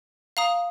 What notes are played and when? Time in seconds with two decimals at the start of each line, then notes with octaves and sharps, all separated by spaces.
0.37 F5 A#5 D#6